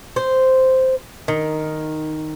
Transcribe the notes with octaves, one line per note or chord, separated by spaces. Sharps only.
C5
D#3